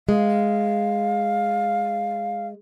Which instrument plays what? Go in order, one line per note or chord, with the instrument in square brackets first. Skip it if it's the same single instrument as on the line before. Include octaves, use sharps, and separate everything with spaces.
[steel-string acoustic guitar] G#3 [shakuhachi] F5